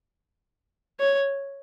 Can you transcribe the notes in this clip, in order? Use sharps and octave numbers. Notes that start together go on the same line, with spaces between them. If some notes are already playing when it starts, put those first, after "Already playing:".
C#5